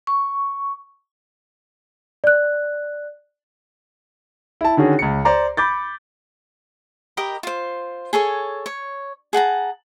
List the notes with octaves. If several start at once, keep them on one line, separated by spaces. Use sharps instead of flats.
C#6
D5 F#6
E4 A5
D3 D#3 C#4 F#4 G#4
C#2 C#7
C5 D5 A#5
B5 D6 G6 A6
G4 A#4 D#5 B5
F4 C5
G#4 A4 C#5 G#5
C#5
G#4 F#5 A5 A#5